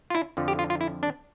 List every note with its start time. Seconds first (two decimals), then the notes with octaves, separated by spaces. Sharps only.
0.10 F4
0.15 E4
0.37 F2 D3 F3
0.48 G4
0.59 F4
0.70 F4
0.81 E4
1.03 D4